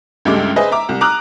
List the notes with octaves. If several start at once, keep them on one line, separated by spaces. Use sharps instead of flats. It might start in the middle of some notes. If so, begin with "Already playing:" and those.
C#2 G2 G#3 A3 E5 D6
G#4 B4 C5 D#5 E5
E5 A#5 D6
C2
A#5 D6 D#6 F6 F#6